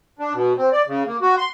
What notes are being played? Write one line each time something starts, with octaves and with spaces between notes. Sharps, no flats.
D4
B2
C4
D5
C#3
A#3
F#4
C6